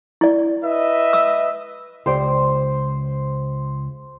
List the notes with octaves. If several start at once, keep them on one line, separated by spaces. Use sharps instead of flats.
E4 D5
B4 D#5 E5
E6
C#2 G4 C5 D5